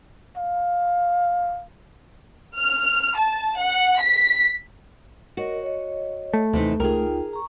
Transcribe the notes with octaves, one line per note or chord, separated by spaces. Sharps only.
F5
F6
A5
F#5
B6
F#4 A#4 C#5 D#5
C#5 D#5
A3
D#2 C3 E3 D#4
C#2 D#4 F4 G#4 A#4 G5
A#5 C#6